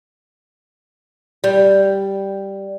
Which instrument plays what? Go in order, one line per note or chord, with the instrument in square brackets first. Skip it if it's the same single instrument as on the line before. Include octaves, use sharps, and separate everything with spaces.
[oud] G3